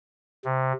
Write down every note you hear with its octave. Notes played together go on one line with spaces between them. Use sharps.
C3